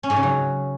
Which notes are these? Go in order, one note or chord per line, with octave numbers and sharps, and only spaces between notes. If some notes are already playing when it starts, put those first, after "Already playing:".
C#4
G#2
C#3
F#3